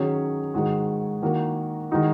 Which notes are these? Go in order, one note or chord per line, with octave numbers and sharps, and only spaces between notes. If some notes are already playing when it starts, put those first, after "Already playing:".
Already playing: D#3 F#3 C#4 G#4 C#5
G#2 D#3 G#3 F#4
D#3 A#3 F#4 A#4
D#3 G#3 D#4 F#4